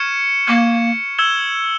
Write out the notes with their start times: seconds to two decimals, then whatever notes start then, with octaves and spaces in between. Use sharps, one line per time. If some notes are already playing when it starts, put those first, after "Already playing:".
Already playing: C#6 F6 G#6 C#7 E7
0.47 A#3 C#6 F6 G#6
1.18 E6 G#6 E7 G7